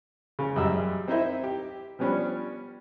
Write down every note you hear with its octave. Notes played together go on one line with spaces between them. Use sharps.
C#3
A1 F#2 G3 G#4 D#5 E6
C4 D#4 E4 C5 D#5 E5
G4
F3 G3 B3 C#4 D4